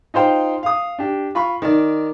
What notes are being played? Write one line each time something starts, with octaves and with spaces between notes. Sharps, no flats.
D#4 F4 C5 G5
F5 D#6
D4 G4
F4 B5 C#6
D#3 D5